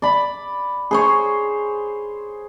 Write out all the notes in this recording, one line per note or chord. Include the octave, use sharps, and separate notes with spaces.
D5 B5
G#4 C5 C#5